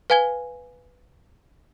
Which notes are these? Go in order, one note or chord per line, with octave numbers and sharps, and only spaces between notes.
B4 F5 G#5 G#6 G7